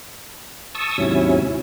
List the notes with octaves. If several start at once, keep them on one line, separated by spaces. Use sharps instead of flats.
A5 C#6 D#6 E6
D#2 G#2 C3 F#3 C#4 E4